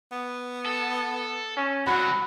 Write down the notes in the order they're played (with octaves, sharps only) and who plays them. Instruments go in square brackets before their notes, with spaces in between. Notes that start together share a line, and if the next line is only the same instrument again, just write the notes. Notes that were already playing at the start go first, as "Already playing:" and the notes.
[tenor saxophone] B3
[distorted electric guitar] A4
[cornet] C#4
[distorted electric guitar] C2 F#3 [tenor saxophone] F#4 [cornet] F#5 [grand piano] B5